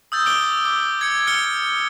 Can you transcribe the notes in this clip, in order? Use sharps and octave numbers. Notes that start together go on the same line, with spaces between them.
D#6 E6 G6 A6
D6 D7 G7
D6
G#6 C#7
F6 C#7 G7